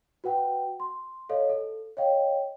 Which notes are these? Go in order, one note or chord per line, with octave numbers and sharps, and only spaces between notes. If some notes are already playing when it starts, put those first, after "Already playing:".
F#4 B4 F#5 G5
C6
A4 C#5 D#5 F5
A4
C#5 D#5 F5 G5